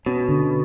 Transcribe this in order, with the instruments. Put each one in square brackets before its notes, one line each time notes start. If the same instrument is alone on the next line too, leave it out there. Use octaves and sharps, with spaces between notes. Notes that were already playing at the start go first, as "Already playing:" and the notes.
[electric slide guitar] B2 [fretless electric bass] C#4
[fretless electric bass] D3